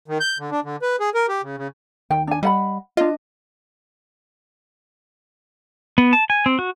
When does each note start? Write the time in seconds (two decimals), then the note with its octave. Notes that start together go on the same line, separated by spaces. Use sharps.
0.08 D#3
0.20 G6
0.39 D3
0.51 D4
0.64 D3
0.82 B4
1.00 G#4
1.14 A#4
1.29 G4
1.43 C#3
1.57 C#3
2.10 D#2 G5
2.27 D4 G#5
2.43 G3 D#5 F#5 B5
2.97 D4 F4 D#5
5.98 B3
6.13 A5
6.30 G#5
6.46 C4
6.59 F#4